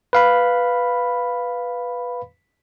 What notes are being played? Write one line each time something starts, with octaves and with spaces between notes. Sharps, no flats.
B4 F5 B5